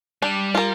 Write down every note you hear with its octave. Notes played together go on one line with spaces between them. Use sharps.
G3 D4
F4 A#4